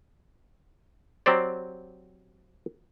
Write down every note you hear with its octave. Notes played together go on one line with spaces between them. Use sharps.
F#3 C4 G4 C5 D5